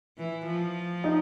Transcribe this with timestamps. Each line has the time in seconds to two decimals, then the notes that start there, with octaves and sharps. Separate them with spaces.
0.18 E3
0.46 F3
1.04 D#4